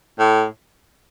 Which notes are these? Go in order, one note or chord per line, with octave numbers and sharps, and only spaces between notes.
A2